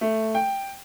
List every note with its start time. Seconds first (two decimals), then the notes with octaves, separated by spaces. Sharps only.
0.01 A3
0.35 G5